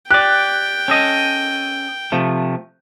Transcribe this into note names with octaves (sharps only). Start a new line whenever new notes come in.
G4 D5 G5 F#6
C#4 A4 D#5
C3 F3 A3